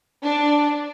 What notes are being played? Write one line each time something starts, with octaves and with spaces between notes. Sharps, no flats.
D4